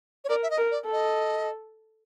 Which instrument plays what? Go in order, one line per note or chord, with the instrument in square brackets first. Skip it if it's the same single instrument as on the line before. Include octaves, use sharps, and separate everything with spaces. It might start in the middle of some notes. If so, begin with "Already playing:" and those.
[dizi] C#5
[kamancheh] A#4 [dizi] D5
[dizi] E5
D#5
[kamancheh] A#4
[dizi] D5
[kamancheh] A4
[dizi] D#5